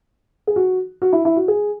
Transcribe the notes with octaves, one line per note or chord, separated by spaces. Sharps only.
G#4
F#4
F#4
E4
E4
F#4
G#4